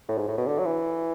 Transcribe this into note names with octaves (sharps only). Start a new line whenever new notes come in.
A2
G#2
A2
B2
D3
F#3
E3